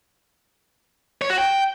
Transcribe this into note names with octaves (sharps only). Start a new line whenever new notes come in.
C#5
F#4
G5